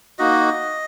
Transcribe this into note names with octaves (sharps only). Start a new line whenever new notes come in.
A#3 D#4 F#4 D#5